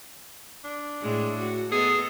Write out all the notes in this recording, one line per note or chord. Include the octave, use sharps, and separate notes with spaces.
D4
A2 G#3
F#4
B3 G#4 A4 D#5